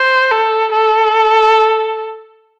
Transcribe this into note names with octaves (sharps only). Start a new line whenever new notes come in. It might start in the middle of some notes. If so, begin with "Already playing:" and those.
Already playing: C5
A4
A4